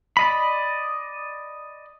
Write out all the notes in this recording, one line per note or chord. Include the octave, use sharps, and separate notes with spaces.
D5 D#5 B5